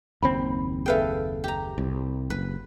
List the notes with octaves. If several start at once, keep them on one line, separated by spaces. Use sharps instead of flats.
F#1 D#2 C4 B5
G#4 A4 B4 E5 F5 G5
G4 A#5
C2
F#1 B4